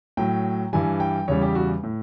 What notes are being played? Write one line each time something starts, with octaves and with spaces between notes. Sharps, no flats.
A2 F#3 G5
G2 E3 G3 G#5
G5
E2 C#3 E3 G3 C#5
G4
F#4
A2